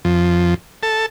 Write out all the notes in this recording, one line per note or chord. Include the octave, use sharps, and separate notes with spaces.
F2
A4